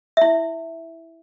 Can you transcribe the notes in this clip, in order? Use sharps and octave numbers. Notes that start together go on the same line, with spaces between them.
E4 E5